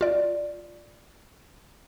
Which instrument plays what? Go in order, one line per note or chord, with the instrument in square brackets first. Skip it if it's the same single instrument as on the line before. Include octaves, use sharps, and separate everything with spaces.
[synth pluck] F4 D5